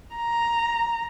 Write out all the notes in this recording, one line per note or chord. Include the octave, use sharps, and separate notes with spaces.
A#5